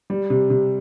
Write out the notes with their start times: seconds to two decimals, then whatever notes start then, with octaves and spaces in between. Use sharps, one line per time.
0.10 G3
0.30 C3
0.50 C3